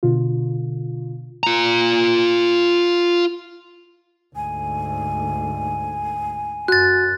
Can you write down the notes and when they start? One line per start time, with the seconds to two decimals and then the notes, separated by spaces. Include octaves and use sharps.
0.03 B2 D3 F4
1.43 F4 A#5
4.36 D2 G#2 G#5
6.68 F#2 F#4 F#6 A6